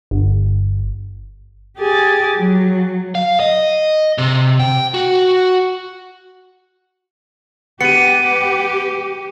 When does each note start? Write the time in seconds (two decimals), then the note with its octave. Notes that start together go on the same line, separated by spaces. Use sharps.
0.11 G1
1.78 G4 G#4 G#5 A6
2.36 F#3
3.15 F5
3.40 D#5
4.18 C3
4.59 G5
4.94 F#4
7.81 B3 G4 C#7 D#7